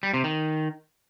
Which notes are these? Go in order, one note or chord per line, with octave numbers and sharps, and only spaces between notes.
G3
C3
D#3